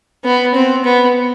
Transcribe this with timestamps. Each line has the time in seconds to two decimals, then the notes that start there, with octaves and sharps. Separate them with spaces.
0.24 B3
0.55 C4
0.85 B3